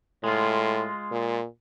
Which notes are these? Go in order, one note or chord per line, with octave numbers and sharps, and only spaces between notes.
A2 G#3 F4
A#2